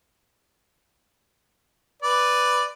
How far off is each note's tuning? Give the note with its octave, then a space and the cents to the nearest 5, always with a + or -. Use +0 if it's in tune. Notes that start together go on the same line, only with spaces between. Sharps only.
B4 +5 D5 +0